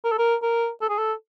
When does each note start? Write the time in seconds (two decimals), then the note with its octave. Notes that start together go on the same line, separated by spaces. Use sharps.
0.04 A#4
0.12 A4
0.18 A#4
0.42 A#4
0.81 A4
0.89 G#4
0.98 A4